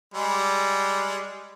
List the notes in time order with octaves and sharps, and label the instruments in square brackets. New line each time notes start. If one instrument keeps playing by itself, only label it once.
[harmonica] G3 G#3